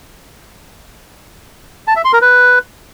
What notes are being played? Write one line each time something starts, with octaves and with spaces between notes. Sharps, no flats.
A5
E5
C6
A#4
B4